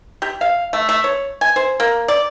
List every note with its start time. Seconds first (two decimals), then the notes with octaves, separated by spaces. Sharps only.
0.22 G4
0.41 F5
0.73 A3
0.89 A3
1.04 C#5
1.41 G#5
1.56 C5
1.80 A#3
2.08 D5